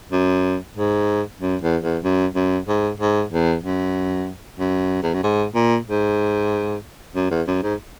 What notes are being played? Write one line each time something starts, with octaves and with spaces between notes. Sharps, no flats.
F#2
G#2
F#2
E2
E2
F#2
F#2
G#2
G#2
E2
F#2
F#2
E2
F#2
G#2
A#2
G#2
F#2
E2
F#2
G#2